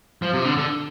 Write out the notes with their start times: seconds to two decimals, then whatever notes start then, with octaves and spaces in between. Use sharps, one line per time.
0.22 F3
0.34 C3
0.45 D3
0.57 D3